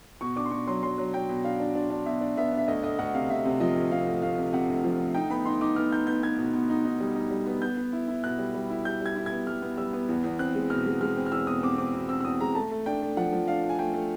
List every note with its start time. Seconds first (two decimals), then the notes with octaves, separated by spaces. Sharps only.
0.21 B2 C#6
0.36 D4 D6
0.45 C6
0.51 B2 C#6
0.67 F#3 C6
0.83 F#3 C6
0.98 F#3
1.13 F#3 G5
1.29 B2
1.44 D4 F5
1.60 D4
1.75 D4
1.90 D4
2.06 B2 E5
2.21 D4
2.37 B3 E5
2.52 D4
2.58 E5
2.68 D2 D#5
2.83 D2 D#5
2.99 D2 F#5
3.14 C3 F5
3.30 C3 E5
3.45 C3
3.60 F3 D#5
3.76 D2
3.91 C3 F5
4.07 D2
4.22 D2 F5
4.38 C3
4.53 C3 F#5
4.69 D2
4.84 F3
5.00 D2
5.14 D#4 G5
5.30 B3 B5
5.45 D#4 C6
5.61 D#4 D6
5.76 B3 F6
5.92 D#4 G6
6.07 B3 G6
6.23 B3 G#6
6.38 B2
6.53 B2
6.70 D#4
6.85 D#4
7.00 G3
7.15 D#4
7.31 G3
7.46 B3
7.62 B3 G6
7.77 B3
7.93 E4
8.08 E4
8.24 B2 F#6
8.39 G3
8.54 G3
8.70 E4
8.85 G3 G6
9.01 G3 G#6
9.16 E4
9.26 G#6
9.32 B3
9.47 G3 F6
9.62 B3
9.77 G3 E6
9.93 B3
10.09 E2
10.24 E2
10.39 C4 F#6
10.55 G#3
10.70 B2 F6
10.86 G#3
11.01 G#3 F6
11.17 C4
11.26 F6
11.32 E2 E6
11.47 B2 D#6
11.63 C4 D6
11.78 C4 D6
11.94 B2
12.09 C4 E6
12.21 E6
12.24 E2 D#6
12.40 G#3 A#5
12.55 A3 A5
12.71 A3
12.86 D4 G5
13.02 A3
13.17 F3 F#5
13.33 F3
13.48 D4 F5
13.64 D4
13.70 G#5
13.79 A3 G5
13.94 A3